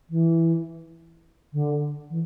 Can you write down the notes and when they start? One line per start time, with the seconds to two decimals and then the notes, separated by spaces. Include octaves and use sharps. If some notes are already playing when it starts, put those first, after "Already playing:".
0.10 E3
1.53 D3
2.10 E3